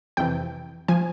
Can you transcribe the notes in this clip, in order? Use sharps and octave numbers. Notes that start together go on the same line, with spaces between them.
F2 C3 E3 G5
F3 G#5